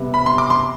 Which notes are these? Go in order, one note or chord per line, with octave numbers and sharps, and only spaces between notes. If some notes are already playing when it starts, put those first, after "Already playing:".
Already playing: C3 G3 B3
B5
C6
D6
C6